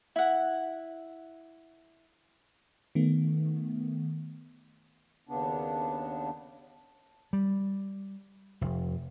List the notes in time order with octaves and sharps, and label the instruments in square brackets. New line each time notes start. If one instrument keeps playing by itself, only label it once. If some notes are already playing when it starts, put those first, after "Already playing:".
[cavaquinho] E4 F#5
[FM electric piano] D#3 A3 B3
[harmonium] D#2 C#3 B3 D4
[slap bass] G3
F1